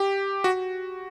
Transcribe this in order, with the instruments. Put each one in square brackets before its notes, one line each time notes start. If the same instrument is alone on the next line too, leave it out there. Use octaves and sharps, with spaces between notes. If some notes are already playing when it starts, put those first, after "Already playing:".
Already playing: [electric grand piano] G4
F#4